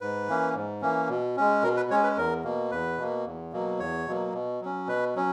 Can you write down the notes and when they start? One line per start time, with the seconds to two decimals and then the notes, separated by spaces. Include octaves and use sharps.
0.01 G#2 B4
0.28 E3 A#3 C#4
0.55 G#2
0.81 E3 A#3 C#4
1.09 B2
1.37 G#3 C#4
1.63 B2 A#4
1.76 B4
1.90 G#3 C#4 C#5
2.04 B4
2.17 E2 A#4
2.44 B2 A#3
2.71 E2 B4
2.98 B2 A#3
3.26 E2
3.53 B2 F#3 A#3
3.79 E2 C#5
4.06 B2 F#3 A#3
4.33 B2
4.61 F#3 C#4
4.88 B2 B4
5.16 F#3 C#4